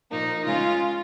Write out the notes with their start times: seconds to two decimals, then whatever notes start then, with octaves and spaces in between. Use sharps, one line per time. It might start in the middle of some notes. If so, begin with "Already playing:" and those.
0.11 A#2 F3 A#3 D#4
0.45 C#3 G#3 C#4 F4